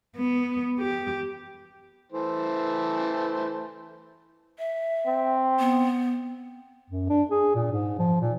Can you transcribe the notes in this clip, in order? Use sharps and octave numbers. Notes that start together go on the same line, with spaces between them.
B3
G4
E3 A3 C5
E5
C4
B3
F#2
D4
G#4
A#2
G#2
F3
A#2